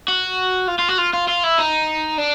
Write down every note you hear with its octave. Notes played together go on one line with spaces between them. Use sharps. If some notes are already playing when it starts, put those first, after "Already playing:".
F#4
F4
F4
F#4
F4
F4
F4
E4
D#4
D4